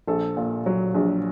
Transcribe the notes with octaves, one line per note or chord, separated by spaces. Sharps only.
A#1 A4
A#2
F#3
A#1